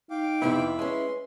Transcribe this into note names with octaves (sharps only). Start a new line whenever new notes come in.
D#4 F5 G5 D6
F2 C3 B3 E4
G#3 C#4 B4 C6